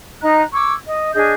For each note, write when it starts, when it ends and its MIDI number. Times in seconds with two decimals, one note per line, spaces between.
0.22 0.42 63
0.22 0.42 75
0.22 0.42 82
0.22 0.42 90
0.53 0.72 85
0.53 0.72 86
0.53 0.72 88
0.53 0.72 92
0.85 1.10 75
1.13 1.33 62
1.13 1.33 68
1.13 1.33 75
1.13 1.33 91